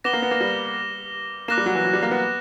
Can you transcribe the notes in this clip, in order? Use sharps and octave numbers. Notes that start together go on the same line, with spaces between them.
B3 D6 A#6 E7 G7
A#3
B3
A#3
G3
A#3 D6 F#6 A#6 E7
G3
F#3
E3
F#3
G3
A#3
B3